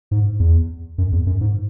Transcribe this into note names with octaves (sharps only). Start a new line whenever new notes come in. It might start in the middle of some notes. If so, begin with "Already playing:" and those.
G#2
E2
F#2
E2
F#2
G#2